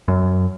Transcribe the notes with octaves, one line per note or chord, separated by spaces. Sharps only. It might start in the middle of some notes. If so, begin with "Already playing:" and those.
F#2